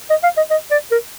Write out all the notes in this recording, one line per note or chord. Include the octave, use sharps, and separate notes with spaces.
D#5
F5
D#5
D#5
D5
A#4